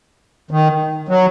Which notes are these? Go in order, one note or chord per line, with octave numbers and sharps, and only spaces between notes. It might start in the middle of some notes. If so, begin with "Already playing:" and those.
D#3
F#3